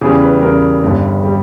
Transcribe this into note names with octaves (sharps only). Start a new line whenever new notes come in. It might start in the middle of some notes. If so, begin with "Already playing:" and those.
E2 C#3 G3 G#4
B4
E2 C#3 G3 A#4
G1 G2 G3
G3